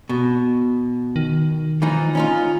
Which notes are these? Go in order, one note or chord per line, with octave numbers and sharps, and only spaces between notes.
B2
D#3
E3 F3 D#4
C#4 D#4 F4